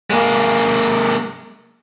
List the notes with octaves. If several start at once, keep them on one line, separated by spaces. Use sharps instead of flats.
G#3 A#3